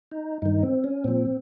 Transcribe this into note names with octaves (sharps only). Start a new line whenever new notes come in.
D#4
G2 D#3 D#4
C4
C#4
A#2 F3 C4